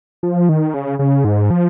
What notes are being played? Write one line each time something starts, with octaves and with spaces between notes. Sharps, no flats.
F3
D#3
C#3
C#3
G#2
F3